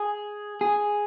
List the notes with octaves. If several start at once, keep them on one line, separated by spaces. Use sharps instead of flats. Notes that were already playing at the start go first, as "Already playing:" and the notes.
Already playing: G#4
G#4